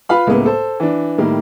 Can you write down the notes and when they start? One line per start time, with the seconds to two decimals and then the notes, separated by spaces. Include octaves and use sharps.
0.09 F4 B4 F5 B5
0.27 C#2 A2 G#3 A#3 B3
0.46 A4 C5
0.80 E3 D4
1.18 A2 D#3 G3 A#3